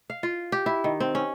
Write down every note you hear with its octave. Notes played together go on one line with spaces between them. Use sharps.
F5
F4
G4
E4
D#3
C4
C#4